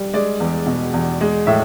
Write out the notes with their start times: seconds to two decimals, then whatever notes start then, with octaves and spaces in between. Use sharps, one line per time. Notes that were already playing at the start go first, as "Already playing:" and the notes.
Already playing: G3
0.14 G#3 D5
0.40 E2
0.66 B2
0.94 E2
1.21 G#3
1.47 A2 E5